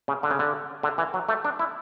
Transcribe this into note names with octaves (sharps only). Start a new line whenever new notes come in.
C#3
D3
C#3
D3
D3
E3
F#3
A3
D4
E4